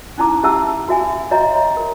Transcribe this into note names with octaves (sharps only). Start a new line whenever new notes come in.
C#4 D#4 E4 A5 A#5 D6
C#4 G4 E5 F#5 A5 E6
F#4 E5 G#5
F#4 C#5 D#5 E5 A#5
A#4